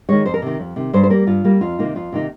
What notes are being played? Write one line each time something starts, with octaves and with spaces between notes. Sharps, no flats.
D#3 G#3 C#5
F2 C5
A#4
C3 D#3
F2
C3 D#3
G2 C5
C5
G3 A#3 A#4
G2 F4
G3 A#3
F2 F4
C3 D#3 A#3 D#4
F2 F4
C3 D#3 A#3 D#4